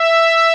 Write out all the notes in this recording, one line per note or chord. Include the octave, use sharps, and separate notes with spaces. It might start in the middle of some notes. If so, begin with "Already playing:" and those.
Already playing: E5